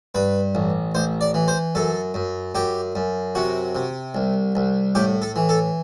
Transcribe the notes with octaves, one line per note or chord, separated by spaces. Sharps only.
G2 B4
A1
A1 C5
D5
E3
C5
F#2 A4
F#2
F#2 G4
F#2
C3 F#4
C3
C2
C2
A2 G4
A4
E3
A4